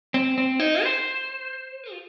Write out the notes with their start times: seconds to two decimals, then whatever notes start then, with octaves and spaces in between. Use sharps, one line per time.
0.14 C4
0.38 C4
0.60 D#4
0.83 C5
1.91 F4